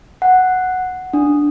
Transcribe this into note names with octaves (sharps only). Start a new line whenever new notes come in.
F#5
D4